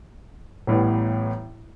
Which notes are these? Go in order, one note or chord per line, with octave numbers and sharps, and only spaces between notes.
A1 A2 E3 G3 B3